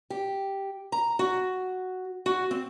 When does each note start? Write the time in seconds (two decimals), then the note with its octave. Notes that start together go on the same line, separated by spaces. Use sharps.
0.10 G4
0.92 A#5
1.19 F#4
2.26 F#4
2.51 C4